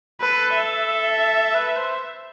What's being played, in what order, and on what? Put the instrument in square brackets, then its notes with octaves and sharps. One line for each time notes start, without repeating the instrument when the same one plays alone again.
[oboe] A4 [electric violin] B4
[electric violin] E5
[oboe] B4
C5